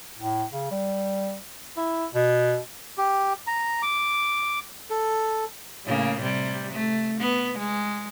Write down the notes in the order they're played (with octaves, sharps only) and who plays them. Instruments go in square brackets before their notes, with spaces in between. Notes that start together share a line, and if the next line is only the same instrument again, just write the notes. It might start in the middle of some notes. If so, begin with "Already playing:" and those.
[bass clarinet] A2
C#3
G3
E4
B2
[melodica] G4
A#5
D6
A4
[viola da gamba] A2 C#3 A#3
C3 G3
A3
B3
G#3